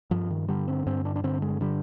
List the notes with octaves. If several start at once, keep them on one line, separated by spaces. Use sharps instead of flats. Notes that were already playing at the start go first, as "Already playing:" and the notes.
G2 F3
D#3
D3 G3
C4
G2 C4
D4
D4
D3 C4
G#3
D3 G3